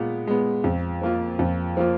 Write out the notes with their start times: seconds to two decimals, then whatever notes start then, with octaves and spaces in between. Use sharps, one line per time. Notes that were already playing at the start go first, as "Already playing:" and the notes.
Already playing: A#2 G#3 B3
0.27 G#3 B3
0.64 F2
1.02 F3 A#3 F4
1.39 F2
1.77 F3 A#3 F4